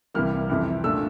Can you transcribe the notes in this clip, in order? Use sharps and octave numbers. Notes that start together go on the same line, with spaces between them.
C2 C3 E3 G3 A#3 F6
F2 C3 E3
A#2 A3 D4 E6